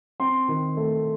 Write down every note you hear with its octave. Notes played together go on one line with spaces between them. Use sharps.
C4 C6
D#3
A3